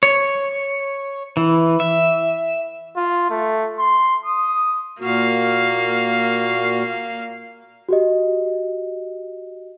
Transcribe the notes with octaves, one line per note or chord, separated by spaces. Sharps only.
C#5
E3
E5
F4
A3
C6
D#6
A#2 A#3 F#4 F5
F#4 G4 D#5